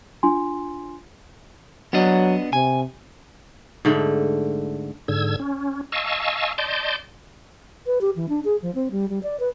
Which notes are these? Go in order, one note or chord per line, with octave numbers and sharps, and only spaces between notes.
D4 F4 G#5 C6
F#3 B3 D4 D#5
C3 G#5
G#2 D3 A3
G#2 D3 E6 G#6
C#4
D#5 F5 G#5 A5 C#6 E6
D5 D#5 A5 C6 G6
B4
G4
E3
D4
G#4
F3
C4
G3
G3
D5
B4